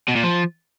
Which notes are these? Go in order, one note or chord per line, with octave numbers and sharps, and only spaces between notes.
B2
A#2
F3